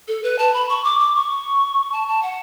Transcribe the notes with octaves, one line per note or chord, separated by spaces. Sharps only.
A4
B4
A5
B5
C#6
D6
D6
C#6
A5
A5
F#5